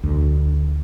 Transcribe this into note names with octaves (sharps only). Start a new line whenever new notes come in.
D2